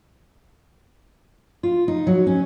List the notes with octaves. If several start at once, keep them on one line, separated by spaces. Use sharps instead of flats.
F4
D#4
F#3
C#4